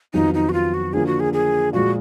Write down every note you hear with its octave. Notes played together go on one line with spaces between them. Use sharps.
F2 D#3 F#3 B3 D#4 F4
D#4
F#4
F4
F#4
D3 F3 A#3 G#4
F#4
G#4
G#4
A#2 F3 G#3 F#4